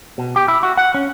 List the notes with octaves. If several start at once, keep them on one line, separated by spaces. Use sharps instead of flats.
B2
G4
E4
F#4
F#5
C#4